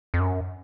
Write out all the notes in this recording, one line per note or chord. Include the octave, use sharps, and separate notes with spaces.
F2
F#2